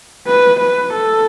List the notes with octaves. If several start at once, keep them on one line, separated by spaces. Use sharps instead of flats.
B4
B4
A4